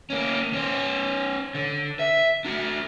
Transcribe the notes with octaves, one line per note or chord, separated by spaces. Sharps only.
A#3 C#4
C#4 C5
D3
E5
D4 F#4